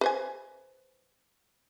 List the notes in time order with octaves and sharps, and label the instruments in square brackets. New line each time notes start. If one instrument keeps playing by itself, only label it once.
[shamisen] B4 C5 G#5